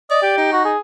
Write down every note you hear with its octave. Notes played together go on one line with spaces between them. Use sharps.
D5 D#5
G4
D#4
F#4
G#4